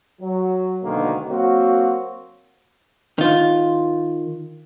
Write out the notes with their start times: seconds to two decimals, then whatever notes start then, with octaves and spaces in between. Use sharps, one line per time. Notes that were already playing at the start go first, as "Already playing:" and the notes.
0.21 F#3
0.83 D2 B2 D3 D#3 G#3 A#3
1.27 F#3 A#3 C4 F#4
3.18 D#3 F4